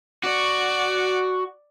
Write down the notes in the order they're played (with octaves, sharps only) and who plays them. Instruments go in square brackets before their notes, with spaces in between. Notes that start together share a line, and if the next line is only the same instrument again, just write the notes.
[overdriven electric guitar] F#4 [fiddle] D5